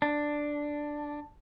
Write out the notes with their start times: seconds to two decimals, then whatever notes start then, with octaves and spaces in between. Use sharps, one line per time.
0.02 D4